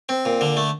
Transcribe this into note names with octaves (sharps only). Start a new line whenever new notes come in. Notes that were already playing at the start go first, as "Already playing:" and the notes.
C4
A#2
D3
A3